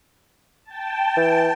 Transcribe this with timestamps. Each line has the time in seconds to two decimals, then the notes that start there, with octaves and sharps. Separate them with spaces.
0.64 G5 A5
1.17 E3